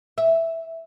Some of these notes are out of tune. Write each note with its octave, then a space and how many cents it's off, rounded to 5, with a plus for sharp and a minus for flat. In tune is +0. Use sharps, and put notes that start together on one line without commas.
E5 +0